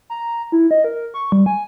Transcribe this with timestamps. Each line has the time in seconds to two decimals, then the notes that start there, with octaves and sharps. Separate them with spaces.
0.10 A#5
0.52 E4
0.71 D#5
0.84 A#4
1.14 C#6
1.32 G3
1.46 G#5